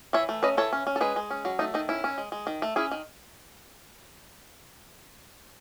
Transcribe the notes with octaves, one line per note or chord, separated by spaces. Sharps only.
E3 C#5 E5
A3
C#4 B4 D#5
E3 A4 C#5
C#4
C#4
A4
G#3 G#4 B4
G#3
C#4
F#3
A3 D#4
D#3 D#4
C#4 E4
C#4
G#3
G#3
D#3
A3
C#4 E4 G#4
D#3